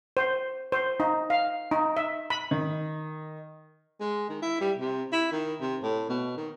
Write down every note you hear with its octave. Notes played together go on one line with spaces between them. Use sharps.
C5
C5
D#4
F5
D#4
E5
B5
D#3
G#3
D#3
E4
G3
C3
E4
D#3
C3
A2
B2
D#3